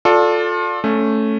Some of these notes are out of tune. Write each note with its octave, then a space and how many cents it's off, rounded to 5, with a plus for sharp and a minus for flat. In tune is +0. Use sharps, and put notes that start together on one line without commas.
F4 +30 A4 +0 D5 +0
A3 +0 C#4 +0